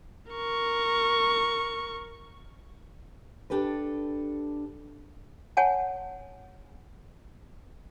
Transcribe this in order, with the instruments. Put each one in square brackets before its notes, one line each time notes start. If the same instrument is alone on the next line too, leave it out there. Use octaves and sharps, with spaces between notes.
[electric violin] A#4 C#6
[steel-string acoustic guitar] D4 G4 A4 B4
[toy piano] C#5 F#5 G#5 A5